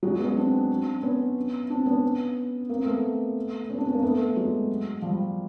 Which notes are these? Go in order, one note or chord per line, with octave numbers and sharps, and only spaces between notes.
F#3 G#3
B3 C#4
C4 D4
B3 C#4
C4 D4
B3 C#4
A#3 C4
A3 B3
B3 C#4
C4 D4
B3 C#4
A#3 C4
A3 B3
F#3 G#3
F3 G3